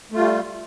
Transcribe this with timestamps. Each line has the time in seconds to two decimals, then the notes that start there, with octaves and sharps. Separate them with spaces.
0.12 A3
0.15 F4
0.18 G3